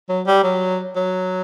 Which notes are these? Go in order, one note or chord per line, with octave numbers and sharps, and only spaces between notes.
F#3
G3
F#3
F#3